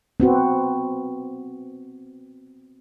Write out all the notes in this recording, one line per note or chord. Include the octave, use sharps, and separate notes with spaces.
B3 C4 F#4